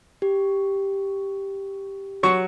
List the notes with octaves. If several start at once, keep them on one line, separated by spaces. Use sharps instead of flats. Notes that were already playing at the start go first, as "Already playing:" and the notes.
G4
F#3 C#6